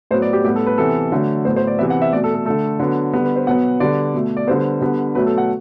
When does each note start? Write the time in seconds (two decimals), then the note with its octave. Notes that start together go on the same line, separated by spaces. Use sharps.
0.11 A2 F#3 B3 C5
0.22 D5
0.33 G4
0.44 A2 G3 B3 G4
0.56 A4
0.66 B4
0.78 C3 E3 B3 A4
1.12 D3 F#3 A3
1.45 A2 F#3 B3 C5
1.56 C5
1.67 D5
1.79 C3 E3 B3 E5
1.90 F#5
2.02 E5
2.12 B2 A3 D5
2.24 A4
2.34 A4
2.46 D3 A3 A4
2.80 D3 F#3 B3
3.14 D3 G3 B3
3.25 B4
3.36 C5
3.47 B2 F#3 B3 F#5
3.80 D3 G3 B3 D5
4.14 B2 A3
4.37 D5
4.47 D3 G3 B3 C5
4.81 D3 G3 B3
5.15 B2 F#3 A3 B4
5.26 A4
5.38 F#5